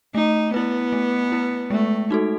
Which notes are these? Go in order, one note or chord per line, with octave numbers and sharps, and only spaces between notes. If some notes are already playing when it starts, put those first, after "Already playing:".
A3 D#4
B3 E4 B4
A3
E4 B4
G#3 A3
D#4 F#4 A4